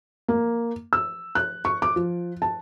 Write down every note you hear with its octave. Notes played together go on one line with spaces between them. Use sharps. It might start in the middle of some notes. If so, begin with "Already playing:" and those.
A#3
E6
F#6
C#6
D6
F3
A5